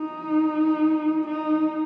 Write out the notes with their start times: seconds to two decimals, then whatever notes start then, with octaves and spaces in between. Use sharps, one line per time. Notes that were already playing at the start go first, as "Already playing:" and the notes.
Already playing: D#4
1.27 D#4